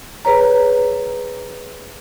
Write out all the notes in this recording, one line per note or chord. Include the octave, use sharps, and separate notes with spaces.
G#4 B4 C#5 A#5